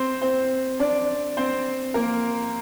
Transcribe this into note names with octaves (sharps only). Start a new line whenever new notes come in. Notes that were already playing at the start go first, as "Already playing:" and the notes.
Already playing: C4 C5
C4 C5
D4 D5
C4 C5
A#3 A#4